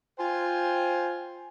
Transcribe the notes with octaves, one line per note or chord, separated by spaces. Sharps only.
F4 C5 G5 G#5